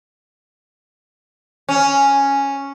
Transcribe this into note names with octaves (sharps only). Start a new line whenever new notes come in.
C#4